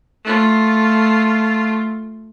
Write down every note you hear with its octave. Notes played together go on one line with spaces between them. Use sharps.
A3 F4